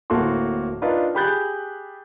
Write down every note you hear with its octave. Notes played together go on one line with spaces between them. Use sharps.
D1 A2 A#3 F#4 A4 C6
D4 D#4 F4 A#4 B4
G4 G#4 B5 F#6 G6 A6